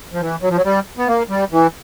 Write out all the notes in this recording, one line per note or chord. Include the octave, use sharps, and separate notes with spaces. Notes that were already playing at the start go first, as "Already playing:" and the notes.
F3
E3
F#3
F3
F#3
G3
B3
A#3
G3
E3